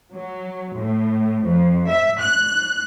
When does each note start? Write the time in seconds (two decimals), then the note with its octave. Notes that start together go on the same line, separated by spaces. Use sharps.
0.14 F#3
0.75 A2
1.45 F2
1.89 E5
2.20 F#6